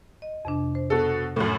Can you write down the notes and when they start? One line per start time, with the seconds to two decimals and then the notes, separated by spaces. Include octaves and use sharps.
0.22 D#5
0.45 F2 C3 D4
0.75 C5
0.90 B2 A4
1.36 F#2 A2